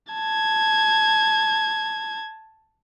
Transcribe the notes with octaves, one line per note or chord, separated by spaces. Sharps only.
A5 G#6